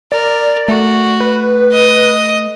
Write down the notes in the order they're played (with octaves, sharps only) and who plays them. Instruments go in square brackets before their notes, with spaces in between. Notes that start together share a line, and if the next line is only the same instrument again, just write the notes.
[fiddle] A#4 [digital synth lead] D5
[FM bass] A3 [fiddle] F#4
[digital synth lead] B4
[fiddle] D#5 D#6